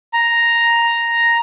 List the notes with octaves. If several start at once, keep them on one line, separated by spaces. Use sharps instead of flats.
A#5